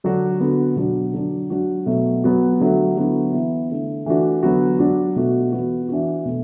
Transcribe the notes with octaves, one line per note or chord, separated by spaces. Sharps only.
D3 F#3 D4 F#4
D3 B3 F#4
B2 F#3 D4 F#4
D3 F#3 D4
F#3 D4 F#4
B2 F#3 A3
F#3 B3 F#4
D3 F#3 A3 F#4
D3 F#3 B3 E4
E3 B3 E4
D3 A3 E4
E3 A3 D4 F#4
D3 F#3 B3 F#4
F#3 D4 F#4
B2 A3 F#4
E3 B3 F#4
E3 D4 F#4
B2 A3